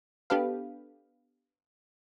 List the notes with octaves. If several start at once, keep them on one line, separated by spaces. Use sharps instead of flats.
B3 D4 G4 A4 B4 F5